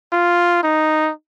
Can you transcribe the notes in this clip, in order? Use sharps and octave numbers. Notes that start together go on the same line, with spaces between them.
F4
D#4